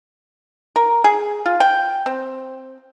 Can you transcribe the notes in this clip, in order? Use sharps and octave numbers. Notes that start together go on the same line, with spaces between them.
A#4
G#4
F4
G5
C4